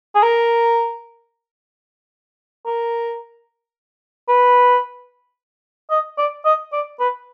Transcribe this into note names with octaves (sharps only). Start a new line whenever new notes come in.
G#4
A#4
A#4
B4
D#5
D5
D#5
D5
B4